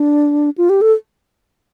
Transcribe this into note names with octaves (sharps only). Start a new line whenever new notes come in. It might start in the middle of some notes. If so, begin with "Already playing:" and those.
Already playing: D4
F4
G4
A4